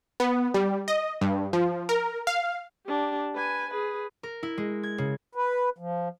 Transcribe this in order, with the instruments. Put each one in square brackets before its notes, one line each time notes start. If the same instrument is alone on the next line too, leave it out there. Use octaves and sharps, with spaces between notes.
[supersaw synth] B3
G3
D#5
G2
F3
A#4
F5
[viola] D4 G4
B4 G#5
G#4 B4
[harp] A#4
E4
G#3
G#6
C#3
[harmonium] B4
F3